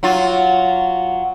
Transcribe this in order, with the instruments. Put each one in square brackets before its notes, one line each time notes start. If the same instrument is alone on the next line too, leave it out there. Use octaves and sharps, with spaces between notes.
[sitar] F#3 F4